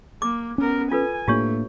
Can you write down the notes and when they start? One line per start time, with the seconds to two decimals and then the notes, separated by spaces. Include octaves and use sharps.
0.22 A#3 D6
0.58 B3 C#4 A#4
0.92 F4 A4 B4 G#5
1.28 A2 A3 A#3 D4 F4 G4 C#5